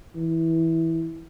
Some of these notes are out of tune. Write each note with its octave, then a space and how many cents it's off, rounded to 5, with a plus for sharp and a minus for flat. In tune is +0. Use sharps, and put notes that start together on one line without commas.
E3 -10